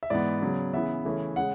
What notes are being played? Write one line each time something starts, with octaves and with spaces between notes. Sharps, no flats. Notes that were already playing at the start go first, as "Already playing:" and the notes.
E5
G#2 E3 B3 D5
C#3 F#3 B3
C#3 E3 B3 E5
C#3 E3 A3 C#4
C#3 G#3 F#5